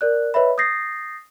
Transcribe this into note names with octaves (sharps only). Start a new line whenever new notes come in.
A#4 D5 F#6
B4 C#5 D#5 E5 B5
D#6 G6 A6 A#6 C7